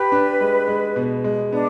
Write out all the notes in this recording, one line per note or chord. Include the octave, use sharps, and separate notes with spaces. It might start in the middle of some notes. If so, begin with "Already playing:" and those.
Already playing: G4 B4
D4
G#3
G#3
B2
G#3
B3 D4